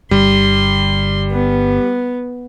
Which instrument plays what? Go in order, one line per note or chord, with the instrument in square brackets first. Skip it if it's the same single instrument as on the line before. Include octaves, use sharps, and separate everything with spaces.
[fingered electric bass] G1 D3 [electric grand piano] G3 [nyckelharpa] C6
[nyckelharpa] B3